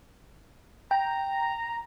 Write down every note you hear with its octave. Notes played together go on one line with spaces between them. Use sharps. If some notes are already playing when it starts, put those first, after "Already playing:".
G5 A#5